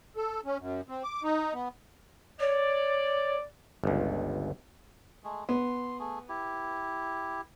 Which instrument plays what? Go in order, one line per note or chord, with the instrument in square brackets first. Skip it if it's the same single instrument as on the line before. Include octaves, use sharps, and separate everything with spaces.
[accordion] A4
C#4
F#2
C4
D6
D#4
B3
[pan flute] C#5 [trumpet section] D5
[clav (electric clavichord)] G1 C#2
[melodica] G#3 A3 G#4
[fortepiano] B3 [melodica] C6
[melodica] A3 G#4
E4 G4